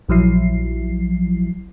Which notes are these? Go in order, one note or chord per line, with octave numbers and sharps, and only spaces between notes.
A#1 F3 F#3 E4 C7